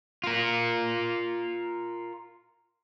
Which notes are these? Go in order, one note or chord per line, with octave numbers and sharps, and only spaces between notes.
F4 A#4